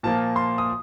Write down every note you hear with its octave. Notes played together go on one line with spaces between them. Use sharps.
A#2 F3 A#3 A5
C6
D#6